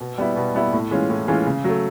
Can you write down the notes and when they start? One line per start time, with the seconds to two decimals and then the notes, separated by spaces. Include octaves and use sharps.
0.01 B2
0.18 G3 B3 E4
0.36 B2
0.55 G3 B3 E4
0.73 A2
0.91 E3 G#3 C#4 F4
1.10 A2
1.28 E3 G#3 C#4 F4
1.46 C#3
1.64 F#3 A3